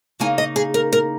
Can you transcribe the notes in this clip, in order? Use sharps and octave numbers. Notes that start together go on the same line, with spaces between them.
C#3 A#3 D#4 G#5
D#5
G#4
A#4
A#4